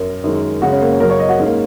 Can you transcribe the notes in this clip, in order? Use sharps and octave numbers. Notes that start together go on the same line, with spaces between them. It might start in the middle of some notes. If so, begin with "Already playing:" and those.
Already playing: F#2 A#4
F#2 D#3 G#3
F#2 C#3 G#3 F#4
C#4
A#3
C#4
F#2 C#3 F#3 A#4
C#5
D#5
F#4
G#2 G#3 C#4
A#3